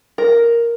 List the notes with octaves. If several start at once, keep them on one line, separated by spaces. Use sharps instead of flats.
A#4